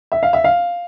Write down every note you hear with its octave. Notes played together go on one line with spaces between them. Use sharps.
E5
F5
E5
F5